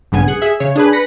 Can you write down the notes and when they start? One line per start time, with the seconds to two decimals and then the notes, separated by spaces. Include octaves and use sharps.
0.12 A#1 G2 C#3 B3 G#5
0.28 G#4 F#6 C#7
0.42 G#4 E5
0.60 C#3 C#5
0.76 D4 G#4 B4
0.93 B4 B5 A#6 C#7